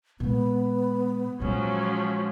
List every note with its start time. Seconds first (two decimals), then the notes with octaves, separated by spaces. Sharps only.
0.20 A#2 G#3 B3
1.40 A#2 F3 F#3 G#3 C#4